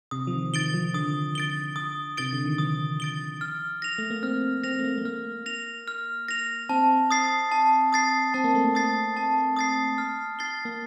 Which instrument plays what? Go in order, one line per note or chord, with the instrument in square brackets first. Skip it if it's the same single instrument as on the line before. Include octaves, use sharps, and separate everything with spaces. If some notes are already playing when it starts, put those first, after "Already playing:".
[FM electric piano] C3 [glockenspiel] D#6
[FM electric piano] F3
D#3
[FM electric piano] D#3 [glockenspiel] A6 D7 G7
[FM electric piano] F3
[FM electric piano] D3 [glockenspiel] D#6
[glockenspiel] A6 D7 G7
D#6
[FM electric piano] C3 [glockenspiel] A6 D7 G7
[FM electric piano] D3
D#3
[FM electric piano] F3 [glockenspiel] D#6
[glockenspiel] A6 D7 G7
F6
A#6 F7
[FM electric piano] A3
A#3
[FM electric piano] C4 [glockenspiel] F6
[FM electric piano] C4 [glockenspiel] A#6 F7
[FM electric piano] A3
A#3
A3
[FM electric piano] A#3 [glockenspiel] F6
[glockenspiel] A#6 F7
F6
A#6 F7
[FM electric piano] C4 [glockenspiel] A5
[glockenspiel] D#6 A6 C7
A5
D#6 A6 C7
[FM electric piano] C4 [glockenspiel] A5
[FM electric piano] A#3
A3
A#3
[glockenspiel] D#6 A6 C7
A5
D#6 A6 C7
F6
A6 C7 G7
[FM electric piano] A#3